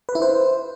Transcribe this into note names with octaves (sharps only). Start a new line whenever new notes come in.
B4
E4
C5